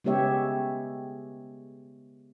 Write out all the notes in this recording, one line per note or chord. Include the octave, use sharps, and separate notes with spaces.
C#3 G#3 B3 G4 C#5 E5